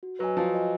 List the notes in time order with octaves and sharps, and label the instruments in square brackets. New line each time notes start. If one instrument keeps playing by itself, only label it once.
[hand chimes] F#4
[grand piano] F#3 [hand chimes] B4 D#5 G#5
[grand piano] F3 [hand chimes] F#4
[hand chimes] B4 D#5 G#5